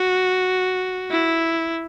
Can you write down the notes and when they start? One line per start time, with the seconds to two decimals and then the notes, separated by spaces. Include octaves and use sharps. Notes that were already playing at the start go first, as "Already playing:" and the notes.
Already playing: F#4
1.11 E4